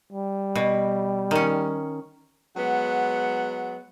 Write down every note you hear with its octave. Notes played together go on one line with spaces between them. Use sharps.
G3
B2
D#3 C#4
F#3 G#3 B3 F#5